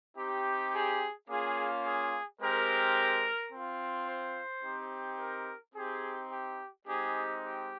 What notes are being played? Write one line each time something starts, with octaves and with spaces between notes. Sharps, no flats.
C4 D#4 G4
G#4
A#3 C#4 F4 G#4
G#4
G#3 C4 G4 A#4
C4 F4
C5
C4 D#4 G4
A#4
C4 D#4 G4 G#4
G4
G#3 C4 D#4 G4 G#4
G4